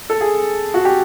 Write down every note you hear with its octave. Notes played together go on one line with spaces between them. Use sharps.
A4
G#4
F#4
G4